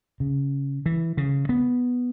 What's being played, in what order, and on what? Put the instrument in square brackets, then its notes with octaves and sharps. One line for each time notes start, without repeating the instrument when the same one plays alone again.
[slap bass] C#3
E3
C#3
B3